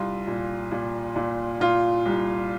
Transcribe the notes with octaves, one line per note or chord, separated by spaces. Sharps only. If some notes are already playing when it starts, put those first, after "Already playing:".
Already playing: C2 F4
A#2
A#2
A#2
A#2 F4
C2